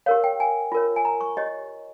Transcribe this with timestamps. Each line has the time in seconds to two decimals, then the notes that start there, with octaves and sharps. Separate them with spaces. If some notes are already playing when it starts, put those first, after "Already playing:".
0.06 G4 A#4 C#5 F5
0.24 G5
0.40 G#5
0.72 F4 A#4 C#5
0.96 G#5
1.05 A#5
1.21 C#6
1.37 G4 C#5 D#5